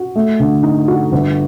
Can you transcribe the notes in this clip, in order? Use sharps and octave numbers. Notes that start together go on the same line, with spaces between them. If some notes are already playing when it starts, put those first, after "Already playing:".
Already playing: F#4
A3
D3
D#4
F#4
G1